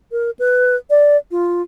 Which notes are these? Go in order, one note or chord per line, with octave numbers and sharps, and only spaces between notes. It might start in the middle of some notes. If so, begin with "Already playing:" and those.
A#4
B4
D5
F4